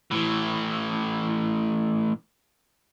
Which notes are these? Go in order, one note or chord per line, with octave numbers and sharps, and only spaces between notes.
A2 E3